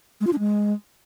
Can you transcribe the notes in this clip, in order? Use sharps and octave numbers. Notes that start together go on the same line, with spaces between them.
G#3
F4
D4
G#3